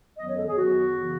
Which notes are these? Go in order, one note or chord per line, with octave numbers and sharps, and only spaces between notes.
F#2 D#3 F#3 B3 D#5
C#5
A4
G#4
F#2 D#3 F#3 B3 F#4
C#3 E3 B3